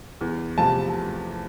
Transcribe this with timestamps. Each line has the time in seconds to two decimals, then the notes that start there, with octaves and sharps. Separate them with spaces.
0.21 E2
0.57 C3 F3 A3 A5